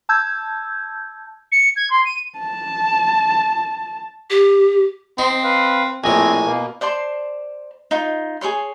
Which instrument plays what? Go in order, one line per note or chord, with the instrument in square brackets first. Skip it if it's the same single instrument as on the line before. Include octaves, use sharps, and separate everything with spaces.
[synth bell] A5 E6 G6 G#6
[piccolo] C#7
G#6
C6
D#7
[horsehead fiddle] A5
[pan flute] G4
[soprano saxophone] C4 [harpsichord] D#4 [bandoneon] C6
[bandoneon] B4 F5
[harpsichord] A#1 A2 [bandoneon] C4 D#5 [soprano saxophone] G#5
[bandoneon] B2 A#3
[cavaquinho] C5 D5 A5 C6
D#4 F4
G#4 A4 C#5 C6